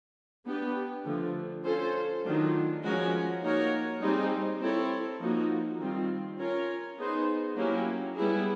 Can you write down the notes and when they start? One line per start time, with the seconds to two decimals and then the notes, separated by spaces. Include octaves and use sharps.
0.46 B3 D4 G4 B4
1.05 D3 F3 A3
1.64 C#4 F4 A4 C5
2.24 D#3 F#3 A3 D4 F4
2.82 F3 G#3 C#4 F#4 A#4
3.41 A#3 D#4 F#4 A#4 C#5
4.01 G3 C4 D#4 G#4 C5
4.60 C4 E4 A4 C#5
5.19 F3 A#3 D#4 F#4
5.79 D#3 G3 C4 F4
6.38 C#4 F4 A#4 C#5
6.98 B3 D#4 G#4 C5
7.56 F#3 A#3 C#4 E4 G4
8.16 G3 B3 E4 G#4